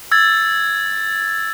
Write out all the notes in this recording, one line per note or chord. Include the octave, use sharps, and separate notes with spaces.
E6 G#6 A6